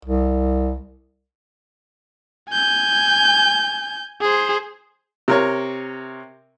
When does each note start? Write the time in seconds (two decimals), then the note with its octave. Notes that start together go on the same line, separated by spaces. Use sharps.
0.05 C2
2.50 G#5 G6
4.21 G#4 C5
5.28 C3 A#4 C#5